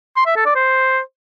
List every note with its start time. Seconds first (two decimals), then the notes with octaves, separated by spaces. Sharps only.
0.16 C6
0.26 E5
0.36 A4
0.46 D5
0.55 C5